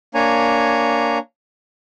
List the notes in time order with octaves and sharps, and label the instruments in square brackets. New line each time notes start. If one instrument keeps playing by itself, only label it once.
[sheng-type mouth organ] A#3 D4 C#5 G#5 A#5